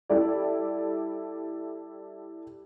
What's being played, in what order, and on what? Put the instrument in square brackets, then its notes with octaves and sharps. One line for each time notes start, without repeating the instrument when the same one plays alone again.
[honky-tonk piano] G3 E4 A4 D5